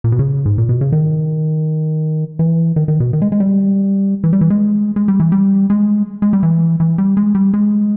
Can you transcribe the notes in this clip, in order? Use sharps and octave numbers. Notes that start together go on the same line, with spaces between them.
A#2
B2
C#3
G#2
A#2
B2
C#3
D#3
E3
D#3
D#3
B2
D#3
G#3
G#3
G3
E3
G3
E3
G#3
G#3
G3
E3
G3
G#3
G#3
G3
E3
E3
G3
G#3
G3
G#3